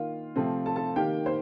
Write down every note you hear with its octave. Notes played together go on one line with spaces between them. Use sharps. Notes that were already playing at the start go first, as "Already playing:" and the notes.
Already playing: D#3 A#3 F4 F5
C3 F3 A3 C4
A4 A5
A4 A5
D#3 A#3 G4 G5
C5 C6